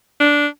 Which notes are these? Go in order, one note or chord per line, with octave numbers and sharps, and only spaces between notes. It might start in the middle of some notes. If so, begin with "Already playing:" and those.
D4